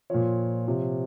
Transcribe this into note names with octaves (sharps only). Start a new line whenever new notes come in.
A#2 F3 C#5
C3 F3